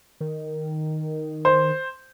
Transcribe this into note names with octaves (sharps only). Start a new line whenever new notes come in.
D#3
C5